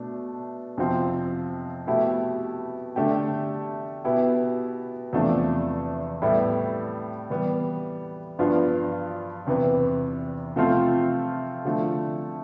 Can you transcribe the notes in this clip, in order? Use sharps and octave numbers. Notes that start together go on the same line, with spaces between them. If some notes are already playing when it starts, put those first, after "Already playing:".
Already playing: B2 A3 D4
F2 C3 F3 C4
B2 A3 E4 G4
D3 A3 D4 G4
B2 B3 E4 G4
E2 C3 F3 A3 D4
A2 G3 B3 E4
E3 G3 B3
G2 F3 B3 D4 F4
E2 C3 E3 B3
C3 F3 A3 C4 F4
D3 F3 A3